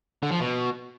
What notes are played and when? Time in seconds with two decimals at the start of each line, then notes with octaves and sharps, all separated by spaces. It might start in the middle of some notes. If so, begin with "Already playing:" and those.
0.23 D3
0.32 F3
0.40 B2